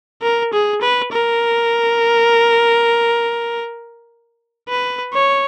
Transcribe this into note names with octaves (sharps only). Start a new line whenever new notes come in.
A#4
G#4
B4
A#4
B4
C#5